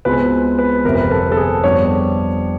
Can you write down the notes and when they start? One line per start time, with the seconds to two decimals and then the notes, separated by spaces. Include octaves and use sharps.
0.05 C#2 B2 G#3 C4 B4
0.59 B4
0.85 G1 F2 C3 A#4
0.95 B4
1.03 A#4
1.11 A4
1.32 A4
1.37 G#4
1.64 F2 D3 G3 B3 D4 C#5